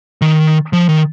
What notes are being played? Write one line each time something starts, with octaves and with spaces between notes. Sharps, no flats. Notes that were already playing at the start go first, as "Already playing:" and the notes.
D#3
F3
D#3